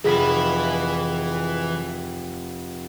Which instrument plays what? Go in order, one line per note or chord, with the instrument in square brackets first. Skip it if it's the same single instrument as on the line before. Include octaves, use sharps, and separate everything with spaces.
[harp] F1 F2 B6 [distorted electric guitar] E3 B5 [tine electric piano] G#4